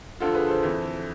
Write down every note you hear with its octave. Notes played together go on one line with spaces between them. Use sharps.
D2 D3 F3 F4 A4
G#4 B4
A4 C5
F2 E3